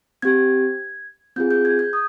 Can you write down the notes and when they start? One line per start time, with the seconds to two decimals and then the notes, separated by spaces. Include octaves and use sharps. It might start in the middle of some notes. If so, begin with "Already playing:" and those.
0.22 C4 G4 G#6
1.36 C4 F4 G#4 G6
1.51 G6
1.65 G#6
1.79 G6
1.93 D#6